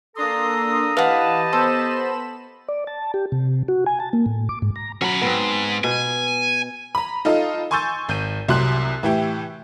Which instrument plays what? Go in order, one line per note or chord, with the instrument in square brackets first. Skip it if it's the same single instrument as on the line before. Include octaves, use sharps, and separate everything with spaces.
[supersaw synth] A#3 D4 C6 [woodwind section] A4 A#5 D#6
[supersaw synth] E3 [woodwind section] G4 D#5 A5 [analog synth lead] B4 [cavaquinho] F5 F#5
[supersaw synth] B3 B5 E7 [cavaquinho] A4 [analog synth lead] C5
[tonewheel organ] D5
A5
G4
C3
F#4
G#5
A5
A#3
A2
D6
G#2
A#5
[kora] F#3 [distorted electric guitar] C#4 B5
[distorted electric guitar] G#2 [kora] B3 C4
[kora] B2 [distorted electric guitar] G#5
[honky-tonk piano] A#5 B5
D#4 F4 A4 D#5 F5
G#5 C6 C#6 E6 G6 A6
G#1 G6 D#7
C2 C3 F#3 C6 F#6
A2 E3 E4 G4